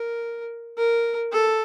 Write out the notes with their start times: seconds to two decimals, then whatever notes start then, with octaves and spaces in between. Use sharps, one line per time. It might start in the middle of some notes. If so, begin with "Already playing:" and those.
Already playing: A#4
0.77 A#4
1.32 A4